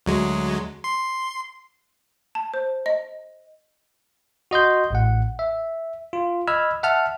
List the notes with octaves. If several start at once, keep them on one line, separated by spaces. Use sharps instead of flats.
D2 F#3 G#3
C6
A5
C5
D#5
F#4 D#5 C6 G6
A1 A2 F#5
E5
F4
D#5 B5 E6 F6 G#6
E5 F#5 A5 F6